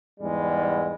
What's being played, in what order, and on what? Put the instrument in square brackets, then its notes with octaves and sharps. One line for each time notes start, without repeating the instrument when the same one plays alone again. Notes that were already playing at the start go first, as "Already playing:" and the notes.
[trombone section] E2 G#2 G3 G#3